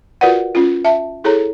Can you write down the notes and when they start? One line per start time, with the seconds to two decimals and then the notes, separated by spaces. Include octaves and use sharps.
0.21 F4 F#4 A#4 B4 D5 F#5
0.55 C#4 F4
0.85 E5 A5
1.24 E4 G#4 A4 C#5 A#5